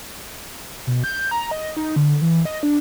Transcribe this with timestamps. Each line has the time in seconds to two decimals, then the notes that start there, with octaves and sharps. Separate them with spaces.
0.87 B2
1.04 G6
1.31 A#5
1.51 D#5
1.77 D#4
1.96 D3
2.22 E3
2.45 D#5
2.63 D4